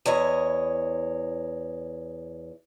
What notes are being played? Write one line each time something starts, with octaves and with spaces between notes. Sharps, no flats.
E2 E4 C#5 D#5